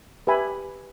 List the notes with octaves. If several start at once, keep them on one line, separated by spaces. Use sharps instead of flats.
G4 B4 E5 G#5 B5